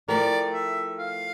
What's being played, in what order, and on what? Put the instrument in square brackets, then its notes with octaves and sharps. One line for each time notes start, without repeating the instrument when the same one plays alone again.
[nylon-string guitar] F3 A3 E4 G4 A#4 [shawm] D5
[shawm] E5
F5